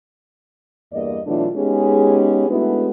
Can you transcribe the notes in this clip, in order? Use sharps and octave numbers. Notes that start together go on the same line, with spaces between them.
E2 G2 A#3 D5 D#5
B2 E3 F#3 A3 D4 F4
G#3 B3 C#4 D#4 G4 G#4
G#3 A3 B3 D4 E4 F#4